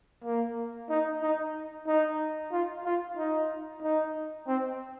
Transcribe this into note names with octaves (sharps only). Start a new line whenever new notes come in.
A#3
D#4
D#4
D#4
F4
F4
D#4
D#4
C4